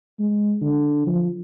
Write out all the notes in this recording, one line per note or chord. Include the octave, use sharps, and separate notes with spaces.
G#3
D3
F3